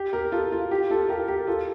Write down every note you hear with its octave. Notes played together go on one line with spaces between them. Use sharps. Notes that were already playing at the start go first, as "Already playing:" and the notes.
Already playing: G4
G4 A#4
F4 A4
F4
G4
F4 A4
G4 A#4
G4 A#4
F4 A4